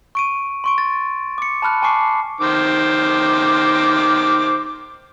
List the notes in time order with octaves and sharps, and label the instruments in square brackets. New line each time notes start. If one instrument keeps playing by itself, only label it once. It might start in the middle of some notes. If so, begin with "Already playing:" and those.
[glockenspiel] C#6 D7 D#7
C6 C#6 D7
A6
D6 C#7
A5 B5 F6 F#6
G#5 A5 C#6 D6 C7
[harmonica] D#3 C5 D6